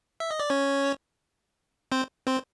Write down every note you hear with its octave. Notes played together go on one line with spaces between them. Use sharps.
E5
D#5
D5
C#4 C#5
C4 C5
C4 C5